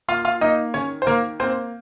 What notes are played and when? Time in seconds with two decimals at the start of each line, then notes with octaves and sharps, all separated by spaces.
0.08 A#3 F4 F5
0.25 F4 F5
0.41 A#3 D#4 D#5
0.74 D#3 C#4 C#5
1.02 C5
1.07 D#3 A#3 A#4
1.40 A#3 C4 C5